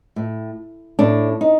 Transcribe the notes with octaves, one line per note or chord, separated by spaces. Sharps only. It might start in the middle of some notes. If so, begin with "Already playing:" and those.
A2
A2 D4
D#4